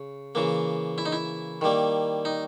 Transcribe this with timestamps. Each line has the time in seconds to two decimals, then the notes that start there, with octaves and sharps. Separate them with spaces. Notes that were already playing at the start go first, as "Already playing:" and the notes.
Already playing: C#3
0.35 C#3 E3 A#3
0.98 E4
1.06 D#4
1.12 E4
1.61 D#3 G3 A#3
2.25 D#4